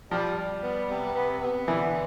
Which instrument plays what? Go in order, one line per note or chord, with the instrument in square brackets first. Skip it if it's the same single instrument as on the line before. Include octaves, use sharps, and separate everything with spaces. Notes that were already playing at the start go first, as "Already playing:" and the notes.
[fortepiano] F3 [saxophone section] G3
[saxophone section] G3
B3
C3
B3
B3
[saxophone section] D3 [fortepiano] E3